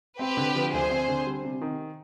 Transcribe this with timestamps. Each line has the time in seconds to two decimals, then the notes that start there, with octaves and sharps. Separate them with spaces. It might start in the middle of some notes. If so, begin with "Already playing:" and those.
0.19 C4 G4 B4
0.37 D3
0.55 F3
0.72 D2 G#4 C5
0.90 C4
1.08 D3
1.26 G3
1.44 C3
1.61 D#3